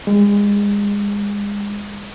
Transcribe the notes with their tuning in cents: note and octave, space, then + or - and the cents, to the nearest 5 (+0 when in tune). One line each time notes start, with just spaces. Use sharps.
G#3 -30